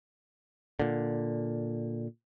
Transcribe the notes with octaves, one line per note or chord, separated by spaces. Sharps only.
A#2 D3